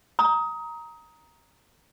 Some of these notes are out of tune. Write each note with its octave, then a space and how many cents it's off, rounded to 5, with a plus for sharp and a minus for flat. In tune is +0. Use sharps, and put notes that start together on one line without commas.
A#5 +0 D#6 +20